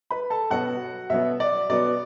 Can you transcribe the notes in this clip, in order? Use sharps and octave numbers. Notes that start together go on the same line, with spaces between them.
B4 B5
A4 A5
B2 F#3 B3 F#4 F#5
B2 F#3 B3 E5
D5
B2 F#3 B3 D5